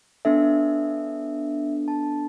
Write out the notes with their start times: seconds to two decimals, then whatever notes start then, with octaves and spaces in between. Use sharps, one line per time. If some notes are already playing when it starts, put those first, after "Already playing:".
0.25 B3 D4 A4 E5
1.88 A5